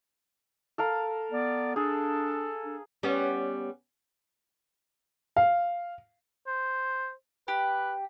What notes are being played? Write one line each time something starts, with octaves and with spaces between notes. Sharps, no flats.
A4 A#4 F5
B3 D5
D4 G#4 A4
D4
G3 B3 C#4
F5
C5
G4 B4